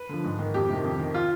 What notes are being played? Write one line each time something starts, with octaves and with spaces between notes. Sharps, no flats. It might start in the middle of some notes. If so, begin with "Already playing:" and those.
Already playing: B4
D3 F3
G#2
D#3
F2 G4
C3 D#3
F2
D#3
F4